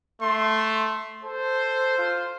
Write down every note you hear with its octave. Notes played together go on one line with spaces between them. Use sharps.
A3 C6
A4 C5
F4